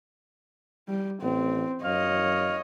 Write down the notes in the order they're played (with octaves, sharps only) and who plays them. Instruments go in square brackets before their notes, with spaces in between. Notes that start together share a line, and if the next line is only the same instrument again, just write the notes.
[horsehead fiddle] G3
[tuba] A1 [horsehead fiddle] C4
[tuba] F#2 [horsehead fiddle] C#5 D#5 [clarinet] F5